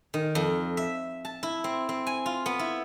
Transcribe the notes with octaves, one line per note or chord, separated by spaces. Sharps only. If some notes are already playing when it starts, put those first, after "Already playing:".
D#3
F2
E5
A5
E4
C4
C4
G#5
F4
B3
E4